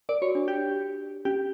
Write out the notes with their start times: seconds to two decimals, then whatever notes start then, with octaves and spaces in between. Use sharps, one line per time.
0.09 A#4 D5
0.22 F#4 C#5
0.35 D4
0.48 G4
1.25 C#4 G4